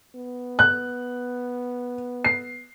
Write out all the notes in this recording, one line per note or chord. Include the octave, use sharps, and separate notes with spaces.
B3
F#6
C7